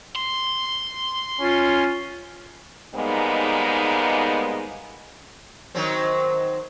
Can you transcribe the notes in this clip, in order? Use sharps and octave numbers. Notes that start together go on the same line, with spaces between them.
C6
C#4 F4
G#2 G3 G#3 A#3 B3 D#4
D#3 F#3 C4